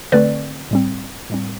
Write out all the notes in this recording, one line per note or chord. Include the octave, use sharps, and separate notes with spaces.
D3 A3 C4 B4 D5
A2 G3 C4
A2 G3 C4